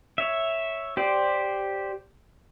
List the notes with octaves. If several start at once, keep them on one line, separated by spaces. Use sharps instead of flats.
C#5 E5
G4 C5 D5